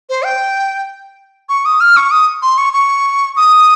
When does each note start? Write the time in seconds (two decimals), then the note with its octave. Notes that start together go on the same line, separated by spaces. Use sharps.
0.09 C5
0.25 G5
1.49 C#6
1.65 D#6
1.81 F6
1.97 C#6
2.11 D#6
2.42 C6
2.58 C#6
2.73 C#6
3.37 D#6